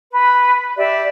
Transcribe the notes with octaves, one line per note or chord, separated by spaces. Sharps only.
B4
G4 D5 E5